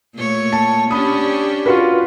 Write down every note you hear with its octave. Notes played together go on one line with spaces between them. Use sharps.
A#2 A3 C#5
A5
C#4 D4 G4 B5 D#6
F4 F#4 B4